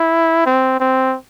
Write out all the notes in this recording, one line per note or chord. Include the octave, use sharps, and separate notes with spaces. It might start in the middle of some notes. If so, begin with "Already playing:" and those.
Already playing: E4
C4
C4